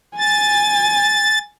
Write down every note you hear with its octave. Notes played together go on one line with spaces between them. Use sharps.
G#5 A6